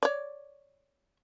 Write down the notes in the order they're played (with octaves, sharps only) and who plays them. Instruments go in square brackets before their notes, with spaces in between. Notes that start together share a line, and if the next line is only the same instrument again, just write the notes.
[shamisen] C#5 D5